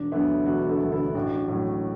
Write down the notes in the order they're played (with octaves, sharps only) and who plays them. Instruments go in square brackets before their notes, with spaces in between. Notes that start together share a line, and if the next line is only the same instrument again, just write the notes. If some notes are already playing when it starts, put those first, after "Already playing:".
Already playing: [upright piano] E1 D4
D2 D3 F#3 B3 E4
E1 D4 F#4
E4 A4
D2 D3 F#3
E4 A4
A1 D4 F#4
A2 F#3